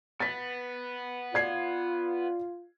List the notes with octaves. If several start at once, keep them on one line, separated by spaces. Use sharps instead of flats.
B3 A6 B6
F4 D5 G#6 C7